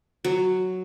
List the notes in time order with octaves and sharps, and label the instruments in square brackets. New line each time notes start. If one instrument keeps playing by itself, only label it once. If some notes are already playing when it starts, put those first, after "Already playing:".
[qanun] F#3